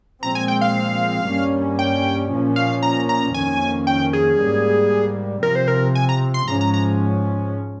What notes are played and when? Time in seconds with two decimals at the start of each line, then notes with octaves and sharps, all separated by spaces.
0.23 A#2 F3 G#3 C4 A#5
0.35 G#5
0.48 G5
0.61 F5
1.26 G2 G3 A#3 C#4
1.79 G5
2.31 A#2 F3 A#3 C#4
2.56 F5
2.83 A#5
3.09 A#5
3.34 F2 D#3 A#3 C#4 G#5
3.87 G5
4.13 G#4
4.39 G#2 G3 A#3
5.43 C3 F3 C4 A#4
5.55 C5
5.68 A#4
5.95 G#5
6.09 A#5
6.34 C6
6.48 G#2 F3 G#3 C#4 A#5
6.61 A#5
6.74 A#5